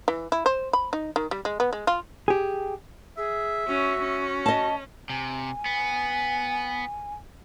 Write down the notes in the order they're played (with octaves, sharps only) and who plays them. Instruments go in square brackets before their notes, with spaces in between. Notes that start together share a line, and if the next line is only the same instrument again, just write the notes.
[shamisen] E3
E4
C5
B5
D#4
D#3
G3
G#3
B3
G#3
F4
[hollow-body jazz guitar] G4 G#4
[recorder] G#4 [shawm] E5
[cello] C#4 [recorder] F#4
[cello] C#4
[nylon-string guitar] D#5 A5
[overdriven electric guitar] C3 [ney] G#5
[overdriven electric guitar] B3